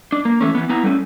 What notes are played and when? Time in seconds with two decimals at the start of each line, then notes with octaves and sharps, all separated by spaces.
0.12 D4
0.25 A#3
0.41 E3 A3 C#4
0.55 E3 B3
0.69 B3 E4 A#5
0.83 G3 A3 C4 C#4